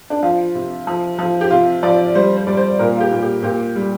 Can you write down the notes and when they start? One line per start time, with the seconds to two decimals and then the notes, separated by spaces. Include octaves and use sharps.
0.10 D4
0.23 F3 F4
0.55 C3
0.87 F3
1.19 F3
1.41 G4
1.51 C3 F4
1.83 F3 D5
2.15 G3 C5
2.37 C5
2.47 G3 D5
2.57 C5
2.79 A#2 A#4
2.96 F4
3.00 G4
3.11 A#2
3.22 G4
3.43 A#2 G4
3.75 G3